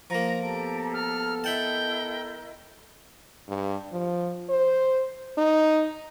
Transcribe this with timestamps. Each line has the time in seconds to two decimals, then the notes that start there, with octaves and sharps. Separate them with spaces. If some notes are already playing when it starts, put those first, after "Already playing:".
0.10 F3 A#3 A#5
0.42 B3 G4 A4 A5 A#5 D7
0.94 F6
1.44 E4 A#4 D#5 E5 F#5 G5 A5
3.48 G2
3.92 F3
4.49 C5
5.37 D#4